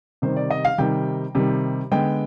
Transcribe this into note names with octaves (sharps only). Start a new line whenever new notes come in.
C3 D#3 G3 C5
D5
D#5
F5
C3 D#3 G3 G5
C3 D#3 G3
D3 G#3 B3 G5